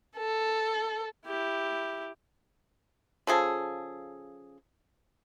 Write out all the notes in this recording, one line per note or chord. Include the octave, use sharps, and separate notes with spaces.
A4
E4 G4
C#3 F3 G#4 A4